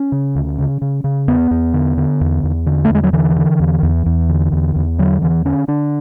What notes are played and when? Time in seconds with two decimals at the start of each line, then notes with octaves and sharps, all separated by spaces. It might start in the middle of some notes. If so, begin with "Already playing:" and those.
Already playing: C#4
0.12 C#3
0.35 D2
0.58 C#3
0.82 C#3
1.04 C#3
1.28 E2 B3
1.51 E2
1.74 D3
1.97 D3
2.21 E2
2.44 E2
2.66 D3
2.85 A3
2.90 E2 G#3
3.04 F#3
3.13 D3 E3
3.36 D3
3.60 E2
3.83 E2
4.06 E2
4.29 D3
4.53 E2
4.76 E2
4.99 D3 F#3
5.22 E2 E3
5.45 D3 C#4
5.68 D3 D4